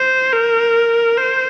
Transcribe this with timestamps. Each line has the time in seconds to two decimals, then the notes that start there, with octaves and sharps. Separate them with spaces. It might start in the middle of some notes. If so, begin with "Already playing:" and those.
Already playing: C5
0.33 A#4
1.18 C5